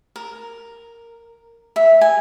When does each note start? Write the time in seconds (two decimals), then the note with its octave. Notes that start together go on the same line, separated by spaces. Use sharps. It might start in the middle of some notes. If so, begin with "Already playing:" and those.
0.16 A#4
1.76 E5
2.01 G#5